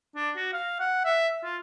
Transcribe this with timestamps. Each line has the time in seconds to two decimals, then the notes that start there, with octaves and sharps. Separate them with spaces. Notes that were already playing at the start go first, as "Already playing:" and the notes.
0.16 D4
0.36 F#4
0.53 F5
0.80 F#5
1.05 E5
1.43 F4